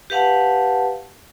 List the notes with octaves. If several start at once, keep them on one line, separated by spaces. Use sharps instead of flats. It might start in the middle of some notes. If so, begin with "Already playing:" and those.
G4 B4 F5 F#5 A5